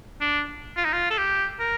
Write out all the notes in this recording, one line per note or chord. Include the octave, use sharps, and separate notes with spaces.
D4
F4
D#4
F4
A4
G4
A#4